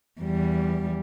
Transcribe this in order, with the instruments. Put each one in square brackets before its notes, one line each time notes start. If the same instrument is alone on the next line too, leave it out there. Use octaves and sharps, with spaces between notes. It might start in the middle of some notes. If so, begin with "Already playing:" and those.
[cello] E2 G3